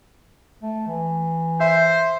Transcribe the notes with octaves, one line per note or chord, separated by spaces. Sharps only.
A3
E3
C5 E5